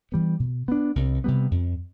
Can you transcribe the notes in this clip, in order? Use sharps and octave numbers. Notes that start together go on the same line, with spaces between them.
E3 G3 B3
B2
B3 D4
C2
C3 G3 B3
F2